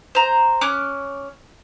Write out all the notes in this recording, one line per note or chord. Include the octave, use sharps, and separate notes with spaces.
C5 A#5
C#4 D6 F6 F#6